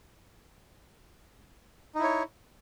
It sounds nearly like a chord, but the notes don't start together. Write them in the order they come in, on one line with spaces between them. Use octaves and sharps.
D#4 E4 C#5